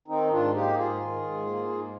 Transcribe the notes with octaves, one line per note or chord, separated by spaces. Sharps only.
D#3 C4 D#4
G#2 D4 F4
A#3 D#4 G4
G#2 F4 G#4
D#3
G#2
A#3
G#2